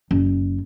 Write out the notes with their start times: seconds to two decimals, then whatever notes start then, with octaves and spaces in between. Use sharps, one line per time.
0.11 F#1